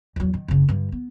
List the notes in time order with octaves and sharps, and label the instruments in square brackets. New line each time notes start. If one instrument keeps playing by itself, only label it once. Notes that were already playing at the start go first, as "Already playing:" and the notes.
[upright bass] E2 F#3
D#3
F#1 C#3
G2 D3
B3